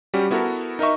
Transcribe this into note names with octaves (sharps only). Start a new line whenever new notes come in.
G3 C#4 F#4 G4
B3 E4 F#4 A4 A#4
D#4 A#4 D#5 E5 C#6